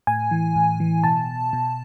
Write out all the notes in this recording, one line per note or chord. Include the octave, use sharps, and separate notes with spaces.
A2 G#5
E3
A2
E3
B2 A5
B2